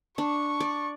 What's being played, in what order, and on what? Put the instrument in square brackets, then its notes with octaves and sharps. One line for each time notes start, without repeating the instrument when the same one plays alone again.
[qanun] D4 [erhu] C#6
[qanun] D5